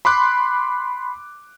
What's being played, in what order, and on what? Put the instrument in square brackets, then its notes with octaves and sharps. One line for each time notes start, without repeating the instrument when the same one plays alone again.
[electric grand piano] B5 C6 D6 F#6